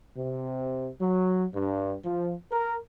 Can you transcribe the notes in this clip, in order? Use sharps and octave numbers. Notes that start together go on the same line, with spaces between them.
C3
F#3
G2
F3
A#4